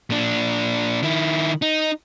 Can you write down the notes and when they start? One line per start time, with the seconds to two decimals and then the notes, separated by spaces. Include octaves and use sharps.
0.10 A#2 D4
1.03 D#3 E4
1.62 D#4